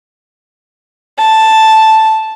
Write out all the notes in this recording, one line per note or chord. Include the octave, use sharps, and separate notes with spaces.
A5